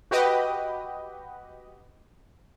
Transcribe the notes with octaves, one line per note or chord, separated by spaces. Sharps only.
F#4 G4 B4 D#5